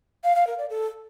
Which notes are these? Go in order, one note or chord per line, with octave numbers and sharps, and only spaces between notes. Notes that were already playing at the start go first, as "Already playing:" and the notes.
F5
F5
A#4
D5
A4